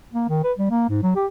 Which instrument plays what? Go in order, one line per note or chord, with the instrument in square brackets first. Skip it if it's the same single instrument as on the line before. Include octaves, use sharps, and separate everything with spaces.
[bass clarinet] A#3
D#3
B4
G3
A#3
G#2
F#3
G4